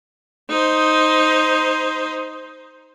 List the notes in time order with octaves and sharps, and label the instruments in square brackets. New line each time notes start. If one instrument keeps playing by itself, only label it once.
[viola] D#4 C5